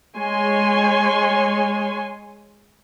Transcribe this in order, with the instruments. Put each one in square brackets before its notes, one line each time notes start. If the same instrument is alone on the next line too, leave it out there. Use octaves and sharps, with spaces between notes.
[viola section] G#3 C#5 G#5 C6